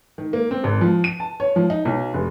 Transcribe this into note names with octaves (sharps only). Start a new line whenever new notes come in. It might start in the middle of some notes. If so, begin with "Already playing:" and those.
D#3
A#3
C4
G#1
F3
D#7
A5
C#5
F3
D#4
B1
F1